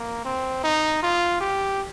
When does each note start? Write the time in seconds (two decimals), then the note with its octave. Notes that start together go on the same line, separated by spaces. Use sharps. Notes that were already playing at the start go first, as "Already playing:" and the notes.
Already playing: A#3
0.25 C4
0.63 D#4
1.03 F4
1.41 G4